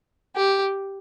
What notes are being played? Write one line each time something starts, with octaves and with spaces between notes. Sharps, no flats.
G4